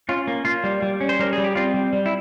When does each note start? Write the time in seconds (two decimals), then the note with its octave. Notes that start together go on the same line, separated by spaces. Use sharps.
0.09 C#4 F4
0.27 A#3
0.45 A#3 F4
0.64 G3
0.82 G3
1.01 C#4
1.09 C5
1.19 G3 A#4
1.33 G#4
1.38 G3
1.44 G4
1.55 C4 F4
1.74 G3
1.93 G3
2.06 E4